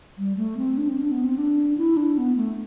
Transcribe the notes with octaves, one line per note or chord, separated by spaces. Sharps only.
G3
A3
C4
D4
C4
D4
B3
C4
D4
E4
D4
B3
A3